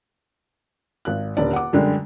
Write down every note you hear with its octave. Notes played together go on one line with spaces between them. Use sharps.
G#1 F#6
D#1 D3 D5
F#5 D6
F#2 D3 G3 G#3